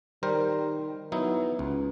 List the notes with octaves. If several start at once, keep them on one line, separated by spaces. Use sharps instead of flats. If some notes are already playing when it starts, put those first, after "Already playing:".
D#3 G3 A#4 C5
F#3 B3 D#4 E4
C#2